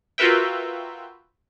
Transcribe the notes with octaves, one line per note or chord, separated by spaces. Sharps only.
F4 F#4 A#4 B4 E5 G5